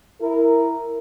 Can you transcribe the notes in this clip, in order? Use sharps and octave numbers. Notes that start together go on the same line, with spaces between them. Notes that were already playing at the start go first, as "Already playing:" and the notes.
E4 A#4